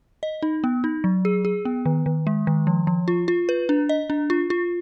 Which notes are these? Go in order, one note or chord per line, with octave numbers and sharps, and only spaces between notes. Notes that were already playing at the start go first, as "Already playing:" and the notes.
D#5
D#4
B3
D#4
F#3
G#4
G#4
B3
D#3
D#3
G#3
D#3
F3
F3
F4
F4
B4
D4
D#5
D4
F4
F4